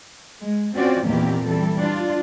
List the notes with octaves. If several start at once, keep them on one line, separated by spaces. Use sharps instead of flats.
G#3
C4 C#4 F4 F#4 D5
E2 A#2 D#3 A#3 C4 G4
E3 G3 A4
D4 F4